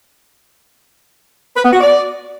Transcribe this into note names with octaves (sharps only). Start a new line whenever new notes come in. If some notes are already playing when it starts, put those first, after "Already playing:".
B4
B3
F#4
D5